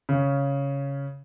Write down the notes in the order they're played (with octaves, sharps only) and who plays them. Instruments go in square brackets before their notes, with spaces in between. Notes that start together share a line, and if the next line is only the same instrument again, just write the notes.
[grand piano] C#3 C#4